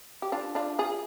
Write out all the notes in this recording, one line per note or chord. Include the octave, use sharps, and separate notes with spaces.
G4
D4 F4
D4 F4
F4 G#4